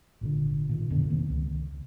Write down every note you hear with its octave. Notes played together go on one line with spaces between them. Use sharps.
G#1 A#2 D3
A#2 D#3
G#1 F2 B2 D3
C3 D#3 A#3
C#2